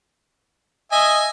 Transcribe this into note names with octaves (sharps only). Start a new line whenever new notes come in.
D#5 E5 G#5